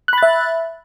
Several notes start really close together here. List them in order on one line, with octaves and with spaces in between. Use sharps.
F#6 B5 A6 E5